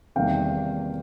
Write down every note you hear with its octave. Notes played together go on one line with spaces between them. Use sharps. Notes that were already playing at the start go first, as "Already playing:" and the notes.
E2 C3 D#3 G3 A#3 F5 G5